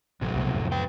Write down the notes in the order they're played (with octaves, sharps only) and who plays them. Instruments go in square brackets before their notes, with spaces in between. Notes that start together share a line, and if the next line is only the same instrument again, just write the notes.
[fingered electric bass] A1 [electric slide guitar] C3 F#3 A3
[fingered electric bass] C2 B2
F2 A2 F3
[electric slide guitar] B4 G5